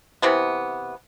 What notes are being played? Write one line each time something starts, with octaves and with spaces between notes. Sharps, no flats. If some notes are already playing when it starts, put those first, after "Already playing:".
C3 E3 B3